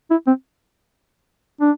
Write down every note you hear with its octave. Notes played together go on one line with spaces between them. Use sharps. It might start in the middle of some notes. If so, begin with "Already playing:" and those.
E4
C4
D4